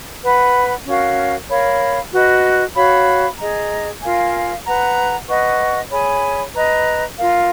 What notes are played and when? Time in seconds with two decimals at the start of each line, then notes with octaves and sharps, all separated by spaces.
0.23 B4 F#5 B5
0.86 C#4 F#4 A#4 F5
1.48 A#4 C#5 F5 B5
2.12 F#4 B4 D#5
2.75 F#4 C#5 F5 B5
3.38 G#4 D#5 A#5
4.01 F4 A#4 F5 G#5
4.65 B4 F#5 A#5
5.28 B4 D#5 F#5 C#6
5.91 G#4 C#5 G#5 B5
6.54 B4 D#5 A#5
7.17 F4 A#4 F5